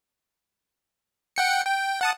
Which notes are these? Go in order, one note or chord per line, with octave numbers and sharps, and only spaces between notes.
F#5 G5 C#7
G5
F#5 A5 D#6